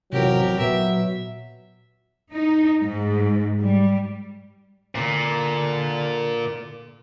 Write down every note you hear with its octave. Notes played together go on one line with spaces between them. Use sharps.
A1 F2 C3 F#3 G4 A#4
A#2 F#3 B3 E5
D#4
G#2
G3
A#2 D3